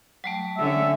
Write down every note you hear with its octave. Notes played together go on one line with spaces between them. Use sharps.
F#3 G3 A3
D3 C#4 E5